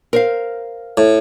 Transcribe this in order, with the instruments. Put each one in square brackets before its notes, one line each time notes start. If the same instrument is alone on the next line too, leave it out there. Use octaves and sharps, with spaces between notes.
[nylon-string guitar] A#4 C5 F5
[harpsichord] A2